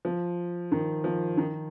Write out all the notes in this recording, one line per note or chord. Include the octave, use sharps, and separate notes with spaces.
F3
D#3
F3
D#3